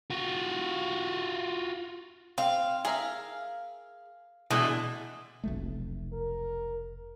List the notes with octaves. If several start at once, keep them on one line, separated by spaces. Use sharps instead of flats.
F4 F#4
C4 F5
G#4 A#4 E5 F5
B2 E3 G#3 A3 D4
F1 B1 A3
A#4